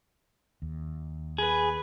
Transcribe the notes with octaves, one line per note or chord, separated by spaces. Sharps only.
D#2
G#4 B4